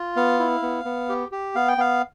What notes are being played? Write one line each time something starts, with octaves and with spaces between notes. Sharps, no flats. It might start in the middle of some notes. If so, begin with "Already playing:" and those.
Already playing: F4
B3 F5
E4
B3
B3
G4
G4
B3 F5
G5
B3 F5